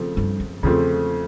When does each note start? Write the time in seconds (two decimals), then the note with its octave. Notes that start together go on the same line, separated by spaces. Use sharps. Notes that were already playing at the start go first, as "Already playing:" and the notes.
Already playing: C#3 F3 A3 C4
0.17 G2
0.40 F#2
0.63 E2 C#3 F3 A3 C4